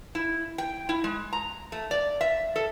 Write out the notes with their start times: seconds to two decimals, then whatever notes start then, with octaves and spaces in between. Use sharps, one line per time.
0.15 E4
0.58 G5
0.89 E4
1.04 G#3
1.33 A#5
1.72 A3
1.91 D5
2.21 E5
2.56 A4